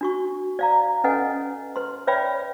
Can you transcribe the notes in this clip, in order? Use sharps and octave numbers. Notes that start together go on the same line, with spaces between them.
D4 F#4 C#6
D5 F5 A#5
C#4 A4 B4 D#5 F#5 G#5
B4 C6
B4 C#5 D5 E5 G5 B5